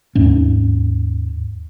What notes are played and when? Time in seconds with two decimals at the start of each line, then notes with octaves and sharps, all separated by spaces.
0.15 D#2 G#2 C#4